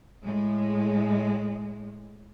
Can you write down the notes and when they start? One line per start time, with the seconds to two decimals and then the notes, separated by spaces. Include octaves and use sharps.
0.25 A2 G#3